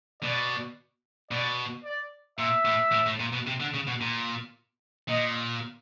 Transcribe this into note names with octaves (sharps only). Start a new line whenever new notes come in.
B2 D5
B2 D5
D5
A#2 E5
A2
A2
A2
A#2
B2
C3
D3
C#3
B2
A#2
A#2 D#5